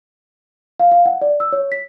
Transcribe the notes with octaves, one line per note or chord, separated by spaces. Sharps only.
F5
F5
F#5
D5
E6
C#5
B6